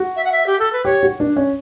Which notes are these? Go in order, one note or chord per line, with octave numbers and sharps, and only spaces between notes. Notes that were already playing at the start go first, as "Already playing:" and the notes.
Already playing: F#4
E5
F#5
E5
G4
A4
B4
G4 C#5
F#4
D4
C#4